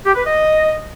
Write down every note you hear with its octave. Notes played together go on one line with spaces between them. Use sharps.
G4
B4
D#5